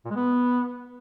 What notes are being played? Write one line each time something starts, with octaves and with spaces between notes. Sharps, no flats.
A#2
G#3
B3